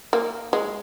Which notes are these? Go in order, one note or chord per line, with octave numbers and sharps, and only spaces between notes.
A#3
G#3